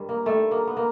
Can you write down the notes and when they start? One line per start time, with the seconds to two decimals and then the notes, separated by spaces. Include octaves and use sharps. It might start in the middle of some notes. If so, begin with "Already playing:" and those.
Already playing: G2 D#3 G3
0.09 A#3
0.26 G2 D#3 G3 A3
0.51 A#3
0.67 B3
0.77 A#3